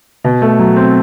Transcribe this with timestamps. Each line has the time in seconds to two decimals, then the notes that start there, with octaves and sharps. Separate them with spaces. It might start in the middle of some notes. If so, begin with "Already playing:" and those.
0.24 B2
0.42 A3
0.59 F#3
0.76 C4